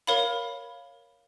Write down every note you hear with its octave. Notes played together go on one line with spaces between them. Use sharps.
A#4 C#5 F5 B5